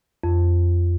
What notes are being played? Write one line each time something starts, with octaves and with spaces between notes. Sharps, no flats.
F2